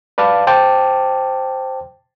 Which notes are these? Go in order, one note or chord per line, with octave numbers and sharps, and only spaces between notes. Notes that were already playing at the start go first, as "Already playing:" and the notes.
B4 D5 F5 A5 D6
C5 G5 A5 D6